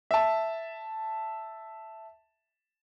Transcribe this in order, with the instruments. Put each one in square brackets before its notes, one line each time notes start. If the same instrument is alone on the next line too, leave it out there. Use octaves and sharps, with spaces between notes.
[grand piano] E5 A5